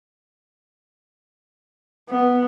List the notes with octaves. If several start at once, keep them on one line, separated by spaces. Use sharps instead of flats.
B3